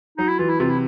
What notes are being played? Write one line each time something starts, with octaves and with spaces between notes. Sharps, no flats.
F#3 D#4
E4
E3 F4
E4
C3 F4
E4